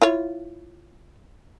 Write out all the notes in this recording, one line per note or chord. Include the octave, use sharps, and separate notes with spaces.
E4 F4 C#5